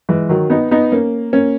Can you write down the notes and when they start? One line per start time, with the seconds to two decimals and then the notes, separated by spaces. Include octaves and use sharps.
0.09 E3 G#3
0.29 D#3 F#3
0.50 B3 D#4
0.71 B3 D#4
0.92 A#3 C#4
1.33 A#3 C#4